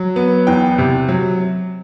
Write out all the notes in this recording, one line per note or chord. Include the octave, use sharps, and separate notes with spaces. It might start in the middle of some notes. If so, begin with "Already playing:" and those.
Already playing: F#3
B3
E2 G5
C3
F#3